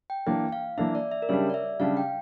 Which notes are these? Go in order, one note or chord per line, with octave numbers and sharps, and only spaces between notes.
G5
E3 A#3 D4 G5
F5
E3 A#3 D4 E5
D5
E5
A#4
C#3 G3 D4 G4 C#5
D5
E5
C#3 G3 D4 G4 F5
G5